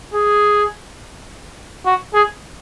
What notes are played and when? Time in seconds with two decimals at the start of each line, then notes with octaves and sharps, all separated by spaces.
0.14 G#4
1.85 F#4
2.14 G#4